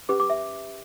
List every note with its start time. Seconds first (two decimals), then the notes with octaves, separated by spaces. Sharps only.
0.09 C#4 G4 B4 D6
0.20 D6
0.30 E5